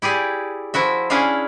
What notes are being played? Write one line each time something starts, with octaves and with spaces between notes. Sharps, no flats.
E4 G4 G#4 D5
F3 E4 F#4 E5
C#4 D4 E4 G#4 E5 F5